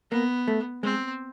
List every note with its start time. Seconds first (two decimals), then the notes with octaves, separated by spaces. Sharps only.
0.11 A#3 B3
0.48 A3
0.83 G#3 C4